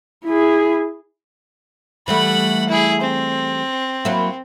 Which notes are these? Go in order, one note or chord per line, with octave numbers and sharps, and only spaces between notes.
E4 G#4
E3 G3 A3 F#5 B5
E4 G#4
C4
F#3 A#3 E4